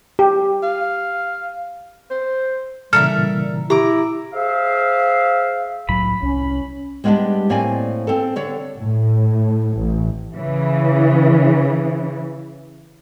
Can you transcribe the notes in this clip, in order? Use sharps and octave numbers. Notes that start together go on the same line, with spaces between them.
G4
F5
C5
A#2 C#3 E3 G3 A4 A#4 E5 F6
E4 G4 A#5 D6
G#4 C5 E5 F5
C2 A2 F#3 B5
C2 C#4
G3 G#3 A#3 B3 D4 G4
A2 A#3 C4 D5 G#5
C4 A4
D3 C#5 D5
A2
A1
C#3 E3